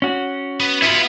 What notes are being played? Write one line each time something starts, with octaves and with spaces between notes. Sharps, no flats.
C#4 F#4
B3
B3 E4 F4 B5